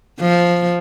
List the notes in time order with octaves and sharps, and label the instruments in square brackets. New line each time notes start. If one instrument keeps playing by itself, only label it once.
[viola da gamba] F3